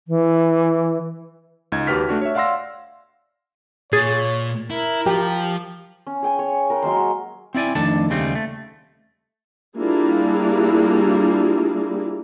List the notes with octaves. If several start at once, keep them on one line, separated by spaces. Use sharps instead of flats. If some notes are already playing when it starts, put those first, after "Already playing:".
E3
C#2 D#4 G#6
D#2 F#4 G4 B4 F6 B6
A3 D4 F#4
C#5 E5
D5 F5 F#5 C6 E6 A#6
A#2 G#4 C#5 A6
E4 A#4
F3 F4 G4
C#4
G#4 G5 G#5
C#5 C#6
A#4 B4 F5 G5
F#3 G#3 A#3 C6
C4 E4 D5 G#5
F2 D#3 A3 D4 A4 A5
D#2 C#3 G3 A3 C4
A3
G3 A#3 D4 E4 F4 G#4